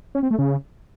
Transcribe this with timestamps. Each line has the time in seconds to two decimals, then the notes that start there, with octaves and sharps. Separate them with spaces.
0.15 C#4
0.23 C4
0.31 A3
0.39 C#3